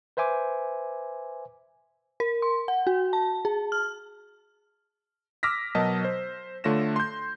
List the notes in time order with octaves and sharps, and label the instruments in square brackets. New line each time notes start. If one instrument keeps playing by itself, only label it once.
[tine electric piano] B4 C5 E5 G#5 D6
[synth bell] A#4
C6
F#5
F#4
A5
G#4
F6
[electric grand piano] D6 E6 F6 A#6 B6
B2 F#3 A#4 D#5 A5
C5
D3 A3 F4 C#5 A#6 E7
C6 G6